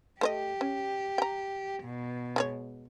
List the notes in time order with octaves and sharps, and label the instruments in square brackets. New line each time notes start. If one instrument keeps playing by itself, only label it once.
[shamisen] A3 C5 D#5 [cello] G4
[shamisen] C#4
G5 A#5
[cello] B2
[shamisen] G#3 G#4 C#5